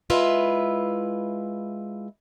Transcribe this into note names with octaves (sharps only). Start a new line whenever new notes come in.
G#3 E4 F4 B4 E5